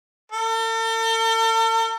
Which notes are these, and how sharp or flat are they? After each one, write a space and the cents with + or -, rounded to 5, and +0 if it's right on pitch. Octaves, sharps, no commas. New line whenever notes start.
A4 +45